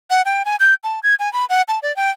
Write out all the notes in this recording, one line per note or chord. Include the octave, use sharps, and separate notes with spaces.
F#5
G5
G#5
G6
A5
G#6
G#5
B5
F#5
A5
D5
G5